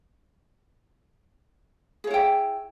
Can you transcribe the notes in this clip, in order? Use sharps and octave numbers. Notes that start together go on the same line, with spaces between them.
E4 G#4 C#5 G5